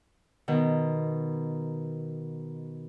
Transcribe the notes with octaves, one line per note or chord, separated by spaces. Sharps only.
B2 D#3